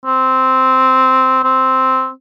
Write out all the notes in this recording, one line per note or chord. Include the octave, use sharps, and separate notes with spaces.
C4
C4